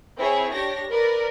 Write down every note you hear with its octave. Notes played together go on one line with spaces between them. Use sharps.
C4 E4 G#4 C#5
D4 G4 C#5 A#6
A#4 B4 D5